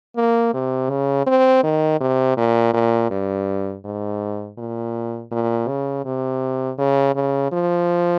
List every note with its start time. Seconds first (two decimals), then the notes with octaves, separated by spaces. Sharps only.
0.16 A#3
0.54 C3
0.90 C#3
1.27 C4
1.63 D#3
2.00 C3
2.37 A#2
2.73 A#2
3.10 G2
3.85 G#2
4.58 A#2
5.32 A#2
5.68 C#3
6.05 C3
6.78 C#3
7.15 C#3
7.52 F3